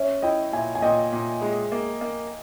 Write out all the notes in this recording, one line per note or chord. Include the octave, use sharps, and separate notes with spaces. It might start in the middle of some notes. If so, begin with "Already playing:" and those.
Already playing: C#4 C#5 E5
E4 D#5 G5
A#2 E5 G#5
G#5
A#2 D#5 G5
A#2
G#3
A#3
A#3